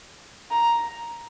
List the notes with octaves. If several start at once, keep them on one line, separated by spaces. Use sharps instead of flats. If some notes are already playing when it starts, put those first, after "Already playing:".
A#5